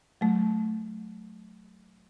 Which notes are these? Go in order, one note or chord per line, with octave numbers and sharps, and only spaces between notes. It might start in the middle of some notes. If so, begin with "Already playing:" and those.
F#3 A3